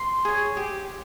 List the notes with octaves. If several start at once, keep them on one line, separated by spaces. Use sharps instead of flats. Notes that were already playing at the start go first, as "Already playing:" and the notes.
Already playing: C6
G#4 C#5
G4